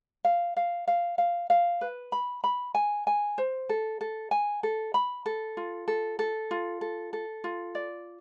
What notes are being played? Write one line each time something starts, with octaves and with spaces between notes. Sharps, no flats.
F5
F5
F5
F5
F5
B4
B5
B5
G#5
G#5
C5
A4
A4
G#5
A4
B5
A4
F4
A4
A4
F4
A4
A4
F4
D5